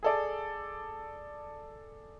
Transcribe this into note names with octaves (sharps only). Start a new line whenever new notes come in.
G#4 A4 D5